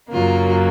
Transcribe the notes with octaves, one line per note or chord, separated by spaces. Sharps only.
F#2 C#3 F#3 A#3 F4